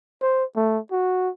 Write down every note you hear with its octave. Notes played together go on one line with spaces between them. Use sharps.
C5
A3
F#4